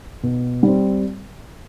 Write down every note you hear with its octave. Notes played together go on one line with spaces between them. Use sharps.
B2
G3 C4